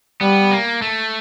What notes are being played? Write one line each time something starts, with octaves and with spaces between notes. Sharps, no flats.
G3 B3
A#3
A3